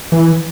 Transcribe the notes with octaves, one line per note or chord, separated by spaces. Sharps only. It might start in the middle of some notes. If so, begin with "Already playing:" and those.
E3